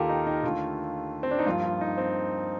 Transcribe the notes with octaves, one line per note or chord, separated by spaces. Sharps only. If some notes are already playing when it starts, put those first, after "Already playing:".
Already playing: D#2 D#3 A#3 F4 G4 A4 A#4
D#4
D#4
D#2 D3 A3 F4
C4
D4
D#4
G2 F3 A#3 F4
F4
D#4
C4